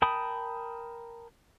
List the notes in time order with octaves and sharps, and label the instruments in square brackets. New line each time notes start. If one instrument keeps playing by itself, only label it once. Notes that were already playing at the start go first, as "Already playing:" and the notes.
[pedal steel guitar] A#4 G5 A5 B5 D#6